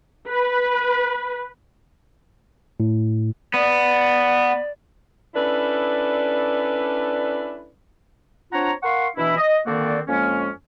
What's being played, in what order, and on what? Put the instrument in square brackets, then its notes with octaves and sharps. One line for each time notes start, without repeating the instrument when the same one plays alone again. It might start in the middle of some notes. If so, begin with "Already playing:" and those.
[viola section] B4
[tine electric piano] A2
[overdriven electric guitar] B3 [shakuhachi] D5
[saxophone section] C#4 D4 E4 A4 B4 D5
[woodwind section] C4 D4 F4 C#5 F#5 A#5
A#4 F5 F#5 C6 C#6
B2 E3 D4 E4
D#5
D3 D#3 A#3 C4 F#4 D5
F2 G#3 A#3 C#4